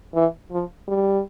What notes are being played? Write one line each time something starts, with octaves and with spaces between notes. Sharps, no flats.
E3
F3
G3